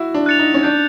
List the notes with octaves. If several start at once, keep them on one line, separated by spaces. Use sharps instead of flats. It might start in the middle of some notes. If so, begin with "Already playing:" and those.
Already playing: E4 F#4
D4
F#6 A6 C#7 F7
D#4
C#4
D4 G6